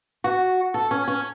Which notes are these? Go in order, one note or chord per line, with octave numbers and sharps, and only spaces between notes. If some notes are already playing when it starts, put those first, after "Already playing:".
F#4
A4
C#4
C#4